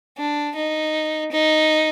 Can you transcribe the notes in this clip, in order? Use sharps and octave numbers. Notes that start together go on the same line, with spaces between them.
D4
D#4
D#4